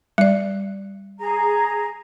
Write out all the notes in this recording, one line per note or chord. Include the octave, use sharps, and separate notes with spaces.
G3 D5
G#4 A#5